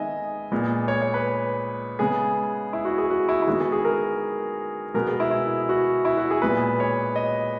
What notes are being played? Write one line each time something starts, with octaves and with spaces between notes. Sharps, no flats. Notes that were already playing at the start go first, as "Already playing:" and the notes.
Already playing: D#3 G#3 B3 D#5 E5 G#5
A#2 G#3 B3
C#5
C#5
B4
C#3 G#3 B3 G#4
E4
F#4
G#4
F#4
E4
E4
D#3 G#3 B3 F#4
G#4
G#4
A#4
B2 G#3 B3 A#4
G#4
E4
E4
F#4
E4
F#4
G#4
A#2 G#3 B3 B4
C#5
D#5